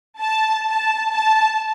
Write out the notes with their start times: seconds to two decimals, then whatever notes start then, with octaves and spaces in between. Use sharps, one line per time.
0.20 A5
0.66 A5
1.12 A5